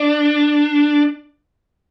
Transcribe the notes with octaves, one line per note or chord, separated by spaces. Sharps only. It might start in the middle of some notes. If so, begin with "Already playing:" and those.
Already playing: D4